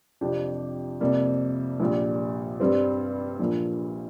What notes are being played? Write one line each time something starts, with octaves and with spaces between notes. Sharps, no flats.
F2 C3 F3 D4 G4
F2 C3 G3 A#3
A#1 A#2 G3
G2 G3 C4 G4 C5
A#1 A#2 F3 A#3